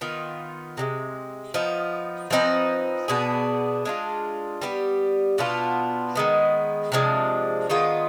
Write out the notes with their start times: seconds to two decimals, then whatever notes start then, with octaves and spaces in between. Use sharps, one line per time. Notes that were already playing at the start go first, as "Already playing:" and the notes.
0.01 D#3 B3 F4
0.77 C3 D#3 G#3
1.54 F3 B3 D#4
2.31 F3 C4 D#4 B4
3.08 B2 B3 D4 G#4
3.85 G#3 D4 F4
4.62 G3 B3 D#4 G4
5.38 B2 B3 D4 F4
6.15 D#3 G#3 B3
6.92 C3 F3 G#3 D4
7.70 D#3 G#3 B3 F4